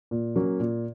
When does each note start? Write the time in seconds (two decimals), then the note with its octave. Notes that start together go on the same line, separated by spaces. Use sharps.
0.11 A#2
0.36 F#3 A#3 C#4
0.60 A#2